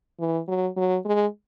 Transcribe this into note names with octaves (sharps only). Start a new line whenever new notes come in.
E3
F#3
F#3
G#3